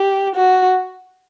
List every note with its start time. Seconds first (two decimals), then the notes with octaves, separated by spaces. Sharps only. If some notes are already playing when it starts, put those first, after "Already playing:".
Already playing: G4
0.36 F#4